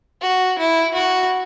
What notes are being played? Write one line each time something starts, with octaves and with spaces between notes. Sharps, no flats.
F#4
E4
F#4